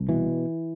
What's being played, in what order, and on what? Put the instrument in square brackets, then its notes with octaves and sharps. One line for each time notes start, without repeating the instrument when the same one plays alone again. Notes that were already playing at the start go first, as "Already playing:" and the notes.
Already playing: [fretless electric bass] C2
B2 E3